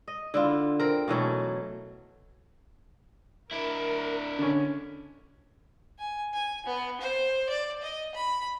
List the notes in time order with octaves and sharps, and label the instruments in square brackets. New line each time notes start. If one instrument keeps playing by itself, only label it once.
[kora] D#5
D3 E4 F4
C4 A#4
B2 E3 F#3 A3
[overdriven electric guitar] D4 E4 [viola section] A#4
[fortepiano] D3 C#4
[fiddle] G#5
G#5
B3
C5
D5
D#5
B5